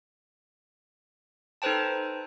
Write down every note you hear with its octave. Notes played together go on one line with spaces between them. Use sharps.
D#4 A4 B4 C5 G5 A5